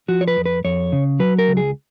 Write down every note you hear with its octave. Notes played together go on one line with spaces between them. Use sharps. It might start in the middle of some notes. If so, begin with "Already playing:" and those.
F3 F#4
C#5
B4
F2
B4
F2 C#5
C#3
F#3 B4
A#4
C#2
G#4